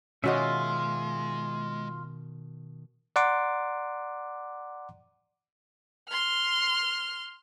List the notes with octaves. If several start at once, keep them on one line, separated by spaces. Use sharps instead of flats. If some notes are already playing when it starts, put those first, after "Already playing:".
B2 D#3 G#3 C#4 F4 F#4 D#5 E5
D5 F#5 A#5 C6 D6
C6 F6